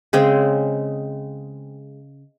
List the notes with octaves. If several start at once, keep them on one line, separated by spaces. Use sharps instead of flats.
C#3 G#3 C4